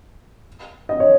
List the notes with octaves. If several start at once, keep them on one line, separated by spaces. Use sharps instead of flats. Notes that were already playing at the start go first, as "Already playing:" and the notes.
D#5
C#5